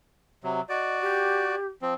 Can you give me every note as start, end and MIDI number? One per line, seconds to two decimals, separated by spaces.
0.44 0.61 48
0.44 0.61 54
0.69 1.55 66
0.69 1.55 74
0.69 0.98 75
1.01 1.66 67
1.82 1.94 53
1.82 1.94 60